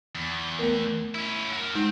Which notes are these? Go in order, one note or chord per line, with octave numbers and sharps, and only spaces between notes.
E2
A3 B3 A#4
C#4 E4
F#4 A#4
G#3 C4 D#4